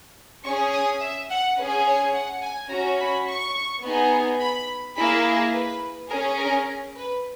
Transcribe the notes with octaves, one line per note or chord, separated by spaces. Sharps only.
C#4 G#4 C#6
D#6
E5
F#5
C#4 G#4 B4
C#5
F#5
G#5
C#4 F#4 A#5
B5
C#6
B3 D#4 G#4
B5
A#3 E4 G#4 B5
B4
C#4 G#4 A#4
A#4
B4